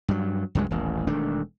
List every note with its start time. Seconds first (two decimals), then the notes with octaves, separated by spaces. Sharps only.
0.08 G2 F#3
0.55 C#2 G2 F#3 G#3
0.71 D#1 A1
1.07 E1 D#3 A3 D4